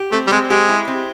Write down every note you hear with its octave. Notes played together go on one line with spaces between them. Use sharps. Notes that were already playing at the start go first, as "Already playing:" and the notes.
Already playing: G4
A3 C4
G3
G#3 C4
G#3 G4
E4
C4